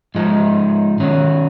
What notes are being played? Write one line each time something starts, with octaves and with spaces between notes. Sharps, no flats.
G#2 F3 G#3 D#4
D#3 F#3 C#4